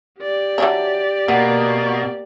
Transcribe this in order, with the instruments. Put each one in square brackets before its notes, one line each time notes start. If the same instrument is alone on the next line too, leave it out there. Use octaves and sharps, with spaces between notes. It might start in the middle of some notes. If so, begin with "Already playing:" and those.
[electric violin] G4 D5
[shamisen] E3 F#3 D4
[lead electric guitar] B2 [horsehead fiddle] A#3 [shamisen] B3